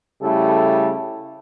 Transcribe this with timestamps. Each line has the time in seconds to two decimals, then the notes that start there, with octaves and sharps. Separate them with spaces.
0.21 C#3 G3 A3 E4 A4